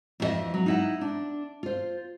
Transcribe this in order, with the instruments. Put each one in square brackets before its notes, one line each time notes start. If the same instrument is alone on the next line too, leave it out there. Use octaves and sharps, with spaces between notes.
[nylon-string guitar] F2 E3 D4 F#4 D#5 E5
F#3
D#4 E4 F#5
D4
F4 C5